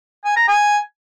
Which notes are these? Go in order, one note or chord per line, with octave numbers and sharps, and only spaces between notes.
G#5
A#5
G#5